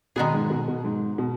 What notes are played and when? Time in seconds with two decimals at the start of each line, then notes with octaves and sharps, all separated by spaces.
0.16 B2 D#3 G#3 B3 G#4
0.34 G#2
0.50 B2
0.68 B2
0.85 G#2
1.18 B2